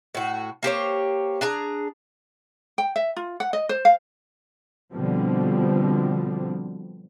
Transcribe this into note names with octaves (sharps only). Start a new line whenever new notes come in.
A2 F#4
A#3 G4 C5 C#5
D4 G#4 A#5
G5
E5
F4
F#5
D#5
C5
F5
B2 D3 F3 G3 C4